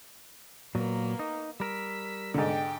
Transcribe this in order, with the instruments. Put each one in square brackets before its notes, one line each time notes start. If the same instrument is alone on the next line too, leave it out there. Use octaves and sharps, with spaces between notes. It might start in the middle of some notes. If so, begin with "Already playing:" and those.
[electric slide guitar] A#2 F#3 [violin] A#3 B3
[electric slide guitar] D#4
[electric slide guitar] G3 A#4 [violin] E6 B6
[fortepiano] G#2 D3 [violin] G4 G5